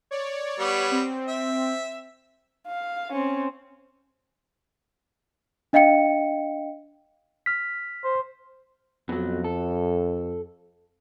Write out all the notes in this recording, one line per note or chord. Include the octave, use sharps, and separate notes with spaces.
C#5 D5
G3 B3
C4
E5
F5
C4 C#4
D4 D#5 F5 G5 C#7
F6 B6
C5
F2 B2 F#3
A4